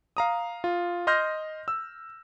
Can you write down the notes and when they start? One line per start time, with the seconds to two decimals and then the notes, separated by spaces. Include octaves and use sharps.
0.17 F5 A#5 D#6
0.64 F4
1.07 D#5 C6 F6 G6 A#6
1.68 E6